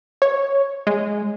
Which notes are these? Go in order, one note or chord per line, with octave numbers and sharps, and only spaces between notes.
C#5
G#3